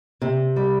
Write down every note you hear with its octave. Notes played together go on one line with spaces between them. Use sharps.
C3
G3